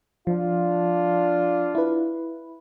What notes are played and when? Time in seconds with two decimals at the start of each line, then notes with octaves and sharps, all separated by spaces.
0.27 F3 D4 F4
1.75 E4 B4